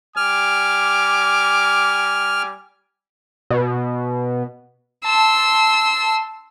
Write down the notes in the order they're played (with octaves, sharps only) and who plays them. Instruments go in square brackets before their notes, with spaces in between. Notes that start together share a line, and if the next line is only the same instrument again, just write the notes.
[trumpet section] G3 G#5 D6 [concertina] F6
[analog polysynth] B2
[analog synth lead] A5 [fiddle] C6 E6